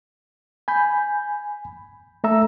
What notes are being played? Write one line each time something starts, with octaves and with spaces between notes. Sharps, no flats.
G#5 B5 G6
A3 A4 E5 A#5 E6